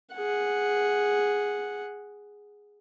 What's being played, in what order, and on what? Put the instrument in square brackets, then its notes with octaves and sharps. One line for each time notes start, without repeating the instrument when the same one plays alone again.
[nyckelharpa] G#4 F#5